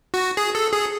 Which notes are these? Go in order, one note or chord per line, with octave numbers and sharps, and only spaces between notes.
F#4
G#4
A4
G#4